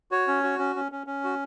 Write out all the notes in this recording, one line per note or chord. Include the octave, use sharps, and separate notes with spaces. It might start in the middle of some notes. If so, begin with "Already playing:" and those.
F#4 C#5
C#4
F#4
C#4
C#4
C#4
C#4
F#4